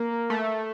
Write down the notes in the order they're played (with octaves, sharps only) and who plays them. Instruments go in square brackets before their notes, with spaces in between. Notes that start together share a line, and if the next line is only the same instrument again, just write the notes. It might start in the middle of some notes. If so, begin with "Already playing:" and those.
Already playing: [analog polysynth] A#3
A3